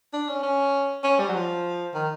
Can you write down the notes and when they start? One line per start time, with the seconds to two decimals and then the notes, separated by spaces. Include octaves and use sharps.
0.13 D4
0.29 C#4
0.43 C#4
1.03 C#4
1.20 G3
1.29 F#3
1.35 F3
1.94 D#3